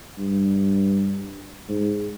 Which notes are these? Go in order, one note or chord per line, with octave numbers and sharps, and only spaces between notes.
G2
G#2